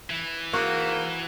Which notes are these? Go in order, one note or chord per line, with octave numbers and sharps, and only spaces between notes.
E3
G#2 A#3 F#4